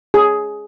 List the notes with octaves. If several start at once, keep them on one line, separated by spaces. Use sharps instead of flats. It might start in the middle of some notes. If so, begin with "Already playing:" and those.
G#4